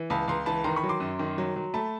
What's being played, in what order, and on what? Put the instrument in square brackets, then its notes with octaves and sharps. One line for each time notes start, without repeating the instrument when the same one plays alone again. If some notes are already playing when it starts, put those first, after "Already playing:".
Already playing: [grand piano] E3
C#2 A5 B5
C#2 A#5 C6
E3 A5 B5
D#3 A#5 C6
B5 C#6
F#3
C6 D6
F#2
D#3
F#3
F#3
A3 A5 B5